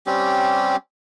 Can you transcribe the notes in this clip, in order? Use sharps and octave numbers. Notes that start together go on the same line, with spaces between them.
G3 C4 C#4 G4